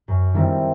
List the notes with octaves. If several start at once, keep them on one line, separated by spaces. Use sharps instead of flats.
F#2
D#3 G3 C4 E4